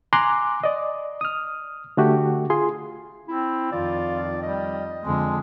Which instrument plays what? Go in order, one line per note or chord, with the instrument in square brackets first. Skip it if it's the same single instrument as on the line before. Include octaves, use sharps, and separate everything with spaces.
[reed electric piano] G#5 A#5 C6 D6 F#6
D5 D#5
D#6 F6
D3 A3 F#4 G4
F4 G#4 C6
[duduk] C4 [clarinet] E4
[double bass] F2 D#3 [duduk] F4 [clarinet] D5
[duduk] G3 [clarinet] D#5
[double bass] F2 D3 [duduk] G#3